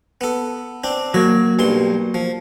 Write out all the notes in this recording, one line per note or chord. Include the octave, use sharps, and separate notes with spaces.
B3 A4
C4 D4
F#3 A#3 F#4
B1 G2 C6
F3